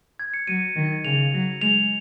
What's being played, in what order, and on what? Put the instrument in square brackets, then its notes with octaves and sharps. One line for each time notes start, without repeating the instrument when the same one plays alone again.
[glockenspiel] G#6
C#7
[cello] F#3 [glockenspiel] D#7
[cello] D#3
[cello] C#3 [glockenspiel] F7
[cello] F#3
[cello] G#3 [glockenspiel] F7